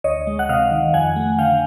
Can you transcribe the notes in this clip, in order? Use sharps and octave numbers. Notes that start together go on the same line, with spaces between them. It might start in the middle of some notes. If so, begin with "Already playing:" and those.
D2 C#5 D#5
G#3
F#5
C3 D#5 F5
D#3
F2 F#5 G#5
A3
D3 F5 G5